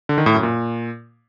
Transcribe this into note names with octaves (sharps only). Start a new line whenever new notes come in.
D3
D#3
A2
F#2
A#2